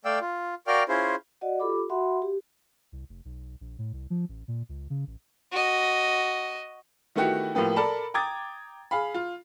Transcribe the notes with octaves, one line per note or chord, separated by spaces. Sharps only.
A3 D5 F5 G5 E6
F4
F#4 A#4 D5 F5 G5 F6
C#4 E4 F4 G#4 C5
F#4 D5 D#5 F#5
F4 G4 A4 B5 D6
F#4 E5 F#5 B5 C6
G4
C2
F1
B1
A#1
A2
C2
F3
A1
A#2
C#2
C#3
A1
F#4 D#5
D#3 A3 B3 E4 F#4 G4
A2 F3 A#3 B3 G4
A4 A#4 D5 A5 B5
G5 A#5 D6 D#6 G#6 A6
G#4 F5 B5
F4